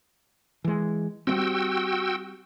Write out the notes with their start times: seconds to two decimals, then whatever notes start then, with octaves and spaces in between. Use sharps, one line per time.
0.64 E3 G#3
1.27 G3 A#3 C4 F#4 G5 E6